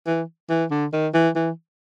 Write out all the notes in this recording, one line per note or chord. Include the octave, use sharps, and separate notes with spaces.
E3
E3
D3
D#3
E3
E3